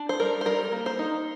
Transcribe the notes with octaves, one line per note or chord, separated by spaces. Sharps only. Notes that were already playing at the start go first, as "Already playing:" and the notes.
Already playing: D4
C5
G3 A#4
C5
G3 A#4
A#3
C5
D#4